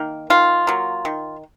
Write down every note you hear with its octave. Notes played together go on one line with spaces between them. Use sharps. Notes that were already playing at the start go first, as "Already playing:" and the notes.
Already playing: D#3 A#3
D#3 F4
F#3 A#3
D#3